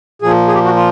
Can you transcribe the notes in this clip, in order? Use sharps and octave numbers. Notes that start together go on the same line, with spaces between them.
A#2 F3 G#4
G#4
G4
F#4
F4